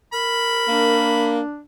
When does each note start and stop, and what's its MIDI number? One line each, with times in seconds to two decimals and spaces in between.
0.13 1.21 70
0.13 1.32 83
0.68 1.40 58
0.68 1.62 62